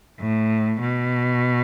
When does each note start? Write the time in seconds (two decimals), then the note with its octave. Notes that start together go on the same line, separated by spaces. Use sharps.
0.20 A2
0.81 B2